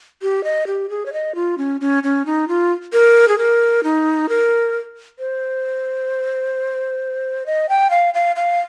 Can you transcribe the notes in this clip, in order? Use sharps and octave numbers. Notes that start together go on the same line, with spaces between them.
G4
D#5
G4
G#4
C#5
D#5
F4
C#4
C#4
C#4
D#4
F4
A#4
G#4
A#4
D#4
A#4
C5
D#5
G5
F5
F5
F5